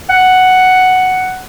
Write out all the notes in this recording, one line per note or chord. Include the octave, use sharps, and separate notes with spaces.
F#5